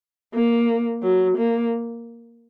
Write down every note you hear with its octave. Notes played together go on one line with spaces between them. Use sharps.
A#3
F#3
A#3